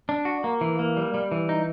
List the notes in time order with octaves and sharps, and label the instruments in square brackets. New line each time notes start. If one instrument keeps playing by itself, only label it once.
[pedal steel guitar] D4
F#4
A#3
E3
A#3
G3
G3
E3
D#4